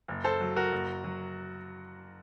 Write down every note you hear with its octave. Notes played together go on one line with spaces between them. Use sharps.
F#1
A4 C5
F#3
F#4 A#4
F#1
F#3